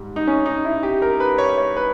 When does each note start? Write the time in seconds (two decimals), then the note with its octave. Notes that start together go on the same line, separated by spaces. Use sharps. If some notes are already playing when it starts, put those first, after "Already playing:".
Already playing: G#2 G3
0.16 D#4
0.27 C#4
0.46 D#4
0.65 E4
0.83 G4
1.02 A#4
1.20 B4
1.38 C#5
1.58 C#5
1.77 B4